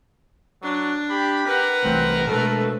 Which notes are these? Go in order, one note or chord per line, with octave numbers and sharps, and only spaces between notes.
F#3 D4
G4 B5
A#4 B4 F#5
C2 E3 A3 C4
B2 G#3 A3 A4 B4